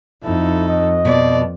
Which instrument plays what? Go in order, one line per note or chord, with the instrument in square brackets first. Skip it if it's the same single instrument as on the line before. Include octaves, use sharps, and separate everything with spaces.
[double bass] F2 [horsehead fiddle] D#4 A4 [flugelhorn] E4
[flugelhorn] D#5
[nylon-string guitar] B2 F3 [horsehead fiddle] D5